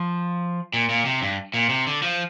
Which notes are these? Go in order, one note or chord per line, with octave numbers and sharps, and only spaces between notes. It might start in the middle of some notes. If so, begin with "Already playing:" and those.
Already playing: F3
A#2
A#2
C3
G2
A#2
C3
D3
F3